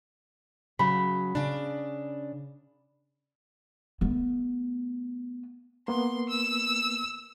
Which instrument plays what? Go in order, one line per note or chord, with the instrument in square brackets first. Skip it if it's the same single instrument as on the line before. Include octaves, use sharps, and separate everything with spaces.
[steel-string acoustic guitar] C#3 F#3 [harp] B5
[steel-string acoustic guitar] C#3 D4
[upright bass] A3 B3
[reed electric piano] A#3 B3 [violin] C6
[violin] E6